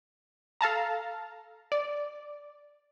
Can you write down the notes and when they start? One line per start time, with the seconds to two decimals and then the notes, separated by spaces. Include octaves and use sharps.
0.61 A4 F5 A5 A#5
1.72 D5